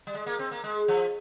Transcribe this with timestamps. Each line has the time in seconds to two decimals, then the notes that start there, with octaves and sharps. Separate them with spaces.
0.07 G3
0.14 G#3
0.26 A#3
0.39 C4
0.51 A#3
0.64 G#3
0.88 F3